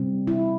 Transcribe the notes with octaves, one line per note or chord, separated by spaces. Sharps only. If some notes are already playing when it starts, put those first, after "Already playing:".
Already playing: C3 G3 C4
E4